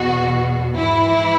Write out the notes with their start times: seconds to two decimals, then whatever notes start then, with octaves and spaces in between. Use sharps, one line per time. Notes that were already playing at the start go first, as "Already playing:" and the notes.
Already playing: E2 B2 F#4
0.78 G#2 E3 E4